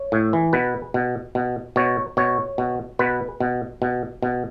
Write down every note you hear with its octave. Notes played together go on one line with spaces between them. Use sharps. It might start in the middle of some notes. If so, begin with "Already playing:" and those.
Already playing: C#5
A2
E3
B2 B4
B2
B2
B2 C#5
B2 C#5
B2
B2 B4
B2
B2
B2